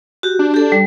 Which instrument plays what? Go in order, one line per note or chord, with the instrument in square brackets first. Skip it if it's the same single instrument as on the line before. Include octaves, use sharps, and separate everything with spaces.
[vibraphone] F#4 G4
[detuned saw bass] D4
[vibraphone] G4 A4
G3